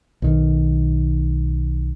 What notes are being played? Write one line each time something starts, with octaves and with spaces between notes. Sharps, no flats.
B1 D#3